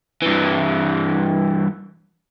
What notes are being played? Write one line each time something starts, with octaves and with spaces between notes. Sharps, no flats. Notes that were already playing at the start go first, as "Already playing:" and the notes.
G2 E3